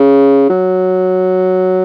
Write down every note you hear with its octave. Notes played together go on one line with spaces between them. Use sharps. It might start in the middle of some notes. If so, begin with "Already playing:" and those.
Already playing: C#3
F#3